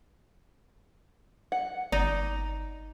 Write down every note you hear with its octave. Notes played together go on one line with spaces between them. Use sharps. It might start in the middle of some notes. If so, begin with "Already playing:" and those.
F#5
G1 D#4 D5